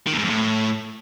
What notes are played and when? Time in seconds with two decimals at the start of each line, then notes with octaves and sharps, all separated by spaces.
0.07 D#3
0.13 E2
0.18 G#2
0.24 F2
0.30 A2